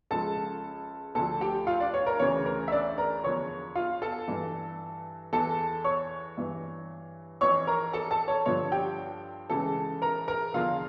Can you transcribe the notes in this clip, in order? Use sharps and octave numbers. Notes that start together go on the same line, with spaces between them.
C#2 C#3 F3 A4 A5
D2 D3 F3 A4 A5
G4 G5
F4 F5
D4 D5
C#5
A#4
D2 C#3 E3 C#5
A#4
E5
D4 D5
A#4 A#5
E2 D3 F3 C#5 C#6
F4 F5
A4 A5
G2 E3
E2 E3 A4 A5
C#5 C#6
G2 E3
F2 E3 C#5 C#6
A#4 A#5
A4 A5
A4 A5
C#5
G2 D3 F3 C#5
G4 G5
C#2 C#3 E3 A4 A5
A#4 A#5
A#4 A#5
E2 D3 F3 F4 F5